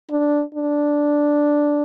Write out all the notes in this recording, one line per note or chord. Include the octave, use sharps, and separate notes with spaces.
D4
D4